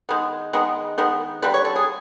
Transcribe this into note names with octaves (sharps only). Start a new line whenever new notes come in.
D#3 G#3 B3
D#3 G#3 B3
D#3 G#3 B3
D3 G3 A#3 B4
C#5
A4
G#4